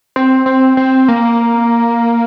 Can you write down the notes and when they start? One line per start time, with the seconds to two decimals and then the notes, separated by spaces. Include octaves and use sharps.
0.16 C4
0.46 C4
0.77 C4
1.08 A#3